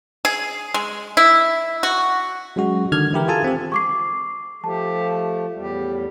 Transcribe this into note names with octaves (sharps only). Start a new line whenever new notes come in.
G#4
G#3
E4
F#4
F#3 G#3 C#4 F#4
D3 D#3 F6 G#6
E3 E4 G4 A#4
F4 G#4 A4 G#5 A5
C4 G4
C#6 D6 C7
F3 A3 G4 A5
E2 A2 G3 G4